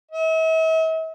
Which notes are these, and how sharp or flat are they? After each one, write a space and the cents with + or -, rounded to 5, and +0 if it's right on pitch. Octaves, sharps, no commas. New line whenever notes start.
E5 -45